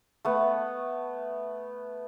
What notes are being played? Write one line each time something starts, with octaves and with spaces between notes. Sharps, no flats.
A3 B3